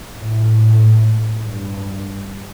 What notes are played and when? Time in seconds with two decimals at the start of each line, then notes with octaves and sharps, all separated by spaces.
0.13 A2
1.45 G2